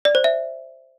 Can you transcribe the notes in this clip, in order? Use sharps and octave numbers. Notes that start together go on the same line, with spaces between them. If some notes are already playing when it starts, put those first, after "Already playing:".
D5
C5
E5